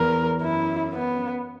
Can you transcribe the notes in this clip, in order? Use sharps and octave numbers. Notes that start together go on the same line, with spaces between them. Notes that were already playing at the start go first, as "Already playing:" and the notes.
Already playing: E2 A#4
F#2 E4
B3